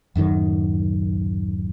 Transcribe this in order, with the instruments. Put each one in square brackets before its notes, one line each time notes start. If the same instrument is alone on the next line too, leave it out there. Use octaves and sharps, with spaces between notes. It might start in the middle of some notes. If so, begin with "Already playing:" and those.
[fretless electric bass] D1 F#2 D#3